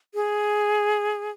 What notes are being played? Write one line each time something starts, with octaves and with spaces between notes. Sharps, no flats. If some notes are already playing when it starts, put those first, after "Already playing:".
G#4